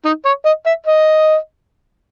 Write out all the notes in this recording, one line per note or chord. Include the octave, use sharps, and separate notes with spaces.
D#4
C#5
D#5
E5
D#5